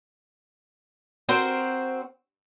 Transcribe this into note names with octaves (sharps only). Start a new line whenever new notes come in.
C4 F#4 A#4 C5